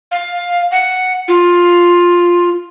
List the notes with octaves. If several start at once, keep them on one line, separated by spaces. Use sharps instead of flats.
F5
F#5
F4